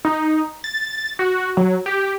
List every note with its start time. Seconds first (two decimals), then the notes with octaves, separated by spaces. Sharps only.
0.05 D#4
0.64 A6
1.19 F#4
1.57 F#3
1.86 G4